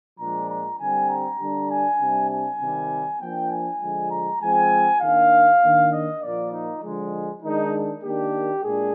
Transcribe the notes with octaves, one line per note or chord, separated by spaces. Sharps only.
A#2 F3 G#3 D4 A#5
A#5
D3 G3 C4 G#5
A#5
D3 G3 D4
G#5
C3 G3 D4
G#5
C3 D#3 G3
F3 A#3 D4 G5
G#5
D3 F3 G#3
A#5
F3 G#3 C4 G#5
D#3 A#3 D4 F5
D#3 A#3 D4
D#5
A#2 F3 A#3 D5
D#4
D3 F3 G#3
D#3 G#3 D4 D#4
D#3 A#3 D4 G4
A#2 G#3 D4 G#4